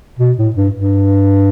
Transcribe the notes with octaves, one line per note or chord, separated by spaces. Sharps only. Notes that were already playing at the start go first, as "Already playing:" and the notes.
B2
A2
G2
G2